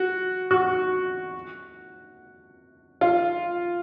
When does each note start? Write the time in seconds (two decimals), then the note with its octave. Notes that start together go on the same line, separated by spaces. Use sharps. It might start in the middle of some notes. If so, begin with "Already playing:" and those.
Already playing: F#4
0.51 F#4
3.01 F4